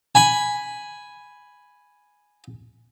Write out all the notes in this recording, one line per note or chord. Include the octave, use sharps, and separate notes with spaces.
G#5 B5